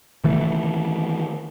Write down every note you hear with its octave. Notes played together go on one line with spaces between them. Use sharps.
D#3 E3 A3